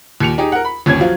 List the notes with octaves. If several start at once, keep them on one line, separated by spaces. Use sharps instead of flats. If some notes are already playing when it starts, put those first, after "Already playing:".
D#2 A#2 C#7 F7
D#4 G4 G#4
A#4 F#5
B5
G1 D#2 C#4 G#6
F3 F#3 F4